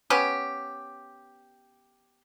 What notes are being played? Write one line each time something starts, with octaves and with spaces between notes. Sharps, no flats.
B3 C#4 G4